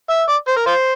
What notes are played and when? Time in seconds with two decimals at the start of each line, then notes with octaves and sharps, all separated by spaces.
0.10 E5
0.29 D5
0.48 C5
0.57 A#4
0.66 F4 C5